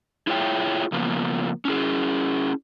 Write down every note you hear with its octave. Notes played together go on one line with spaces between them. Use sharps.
E4 F4 G#4 C#5 E5 G5
C#3 F3 A#3 B3
C#4 E4 G#4